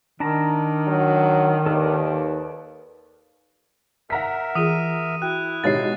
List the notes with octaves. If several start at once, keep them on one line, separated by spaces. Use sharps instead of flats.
D#3 D4 A5 A#5
F#3
D#2 A4 B4 D5
A#4 E5 F#5 A#5 B6
E3 F4 G#4 D#6 D#7
E4 F#4 G5 F#6
B2 G#3 D#4 G4 C#5 F5 A6 C7